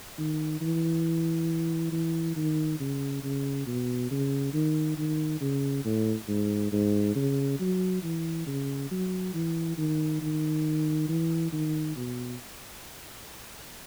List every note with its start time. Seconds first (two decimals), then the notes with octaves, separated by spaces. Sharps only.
0.18 D#3
0.61 E3
1.92 E3
2.36 D#3
2.80 C#3
3.23 C#3
3.67 B2
4.11 C#3
4.53 D#3
4.97 D#3
5.41 C#3
5.85 A2
6.28 G#2
6.72 G#2
7.15 C#3
7.60 F#3
8.03 E3
8.47 C#3
8.91 F#3
9.34 E3
9.77 D#3
10.21 D#3
11.09 E3
11.52 D#3
11.96 B2